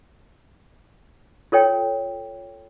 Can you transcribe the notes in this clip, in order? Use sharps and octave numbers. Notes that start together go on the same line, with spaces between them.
F4 A4 C#5 G5